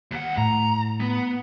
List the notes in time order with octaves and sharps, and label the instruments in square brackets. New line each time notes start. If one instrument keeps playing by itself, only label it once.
[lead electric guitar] D#2 F#5
[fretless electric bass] A2 [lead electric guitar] A#5
[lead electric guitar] B3